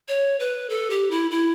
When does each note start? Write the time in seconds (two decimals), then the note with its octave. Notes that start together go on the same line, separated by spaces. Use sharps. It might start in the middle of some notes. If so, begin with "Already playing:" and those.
0.08 C#5
0.40 B4
0.70 A4
0.90 G4
1.11 E4
1.31 E4